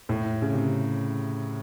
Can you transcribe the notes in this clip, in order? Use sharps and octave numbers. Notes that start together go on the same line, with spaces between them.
A2
C#3
C3